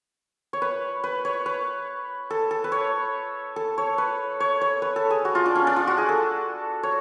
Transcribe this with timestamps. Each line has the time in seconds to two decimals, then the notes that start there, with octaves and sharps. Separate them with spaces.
0.53 C#5
0.62 B4
1.04 B4
1.25 C#5
1.46 B4
2.30 A4
2.51 A4
2.64 B4
2.72 C#5
3.56 A4
3.78 C#5
3.98 B4
4.40 C#5
4.61 C#5
4.82 B4
4.96 A4
5.10 G#4
5.25 F#4
5.35 F4
5.46 D4
5.55 C#4
5.67 D4
5.76 F4
5.87 F#4
5.98 G#4
6.09 A4
6.83 C#5